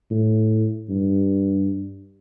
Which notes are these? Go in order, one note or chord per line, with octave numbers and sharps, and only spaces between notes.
A2
G2